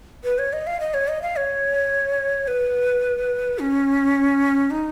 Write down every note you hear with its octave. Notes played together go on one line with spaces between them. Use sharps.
B4
C#5
D#5
F5
D#5
C#5
D#5
F5
C#5
B4
C#4
D#4